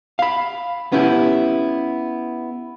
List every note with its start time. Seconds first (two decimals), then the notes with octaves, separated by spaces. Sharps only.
0.19 F5 B5
0.92 B3 C#4 E4 G4